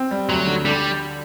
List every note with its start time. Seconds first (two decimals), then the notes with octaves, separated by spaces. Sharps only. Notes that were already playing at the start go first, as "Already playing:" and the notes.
Already playing: C4
0.11 G3
0.29 D2 F#3
0.47 D3
0.65 D3 G3